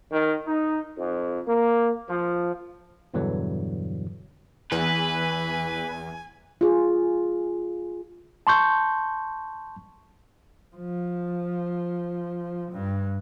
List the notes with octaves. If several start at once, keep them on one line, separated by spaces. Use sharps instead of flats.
D#3
D#4
F2
A#3
F3
E2 G2 B2 D3 E3 F#3
E2 E3 B4 G#5
F4 G#4
A5 C6 C#6 G6
F3
G2